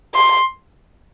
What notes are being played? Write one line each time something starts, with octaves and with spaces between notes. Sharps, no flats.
C6